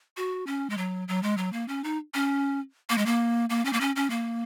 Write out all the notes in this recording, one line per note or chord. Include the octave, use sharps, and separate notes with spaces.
F#4
C#4
G#3
F#3
F#3
G#3
F#3
A#3
C#4
D#4
C#4
A#3
G#3
A#3
A#3
C#4
A#3
C#4
C#4
A#3